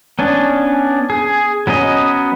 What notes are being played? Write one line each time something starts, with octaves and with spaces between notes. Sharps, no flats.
B3 C#4 D4
G#4
F#3 B3 C#4 D#5